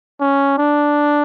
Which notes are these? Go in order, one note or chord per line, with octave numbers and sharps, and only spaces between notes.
C#4
D4